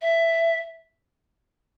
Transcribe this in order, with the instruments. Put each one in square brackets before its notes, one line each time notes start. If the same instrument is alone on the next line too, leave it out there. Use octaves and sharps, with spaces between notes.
[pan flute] E5